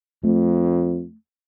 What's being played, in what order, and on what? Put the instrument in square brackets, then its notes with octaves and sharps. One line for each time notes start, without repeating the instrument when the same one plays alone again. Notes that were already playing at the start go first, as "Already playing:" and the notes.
[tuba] F2 [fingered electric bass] A3